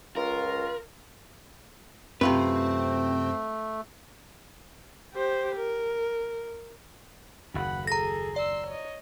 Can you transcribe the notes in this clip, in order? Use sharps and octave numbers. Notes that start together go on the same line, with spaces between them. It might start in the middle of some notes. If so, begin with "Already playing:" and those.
C#2 F4 A#4
F#2 C3 A3 C4 F4 B4
G4 C5
A#4
F#1 D#2 F#5 B5
G#4 A4 A#5 A#6
D5 C6 E6
C#5 D#5